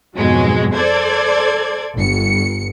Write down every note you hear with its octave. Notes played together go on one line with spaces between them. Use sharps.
F2 G#2 B2 F#3 G#3
A4 C5 D5 G#6
G1 C#7